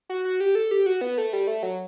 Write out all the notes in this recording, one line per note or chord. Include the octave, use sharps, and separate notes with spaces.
F#4
F#4
G4
A4
G4
F#4
B3
A3
G3
A3
F#3